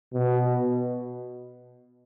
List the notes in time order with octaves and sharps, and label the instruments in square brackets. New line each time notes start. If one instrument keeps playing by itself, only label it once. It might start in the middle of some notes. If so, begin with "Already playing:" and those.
[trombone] B2